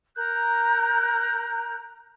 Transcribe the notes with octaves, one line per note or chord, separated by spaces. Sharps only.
A#4 A#5 F#6 G6